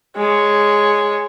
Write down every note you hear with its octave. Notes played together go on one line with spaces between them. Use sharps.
G#3 C#5